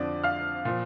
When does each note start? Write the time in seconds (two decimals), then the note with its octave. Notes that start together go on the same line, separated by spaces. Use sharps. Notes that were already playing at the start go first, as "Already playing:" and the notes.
Already playing: F2 D3 F3 D5 D6
0.24 F5 F6
0.65 A#2 F3